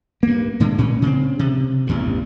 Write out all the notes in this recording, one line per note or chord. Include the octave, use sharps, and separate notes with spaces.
G2 A#3
A2 D3 G#3
A#2 C#4
C#3 C4
C3
A1 E2 G2